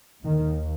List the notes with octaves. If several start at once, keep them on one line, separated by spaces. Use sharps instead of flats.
D#2 D#3